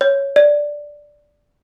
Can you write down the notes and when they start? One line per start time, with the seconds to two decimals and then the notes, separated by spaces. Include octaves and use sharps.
0.01 C#5
0.36 D5